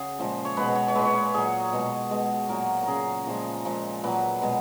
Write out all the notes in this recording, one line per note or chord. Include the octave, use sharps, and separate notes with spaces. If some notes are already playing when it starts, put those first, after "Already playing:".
Already playing: C#3 F#4 G#4
A#2 F3 G#3
C#5
B2 G#3 B4
C#5
C#5
A#2 G#3 B4
C#5
B4
A#2 F#3 G#4
B2 G#3
B2 G#3
A#2 F#3 A#4
A#4
C#3 F#3 G#4
A#2 F3 G#3
A#2 F3 G#3
A#2 F#3 B4
B2 G#3